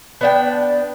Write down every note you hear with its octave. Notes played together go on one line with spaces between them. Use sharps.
B3 D4 G5